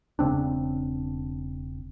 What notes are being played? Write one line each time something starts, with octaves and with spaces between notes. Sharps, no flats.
E1 C#3 C4 D4